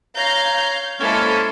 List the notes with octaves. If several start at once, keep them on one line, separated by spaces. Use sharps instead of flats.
C#5 F5 A#5 G6
G#3 A#3 C#4 E4 A4 C5